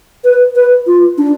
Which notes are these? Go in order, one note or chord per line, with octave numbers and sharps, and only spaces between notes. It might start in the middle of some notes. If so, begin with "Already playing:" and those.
B4
B4
F4
D4